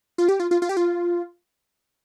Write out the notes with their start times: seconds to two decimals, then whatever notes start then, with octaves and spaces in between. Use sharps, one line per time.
0.18 F4
0.29 G4
0.40 F4
0.51 F4
0.62 F4
0.69 G4
0.77 F4